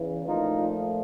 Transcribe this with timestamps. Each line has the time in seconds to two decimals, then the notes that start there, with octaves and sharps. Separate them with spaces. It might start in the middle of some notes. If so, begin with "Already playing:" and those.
Already playing: E2 C#3 E3
0.27 A#2 F3 A3 D#4 F4